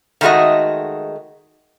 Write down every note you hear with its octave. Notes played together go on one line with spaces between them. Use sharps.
D#3 G#3 A3 C4 F#4 D#5